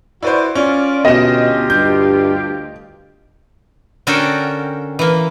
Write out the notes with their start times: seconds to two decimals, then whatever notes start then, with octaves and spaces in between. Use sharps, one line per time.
0.23 E4 F#4 B4 C5 D5
0.55 C#4 F4 D5
1.05 D2 B2 F4 G4 D#5 E7
1.70 G2 G6
4.07 D3 C#4 F#4 A4 A#4 G5
4.99 E3 A#3